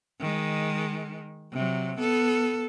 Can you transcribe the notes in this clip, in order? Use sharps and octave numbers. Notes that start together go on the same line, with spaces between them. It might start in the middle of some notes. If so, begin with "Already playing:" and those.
D#3 G#3
C3 F#3
B3 A4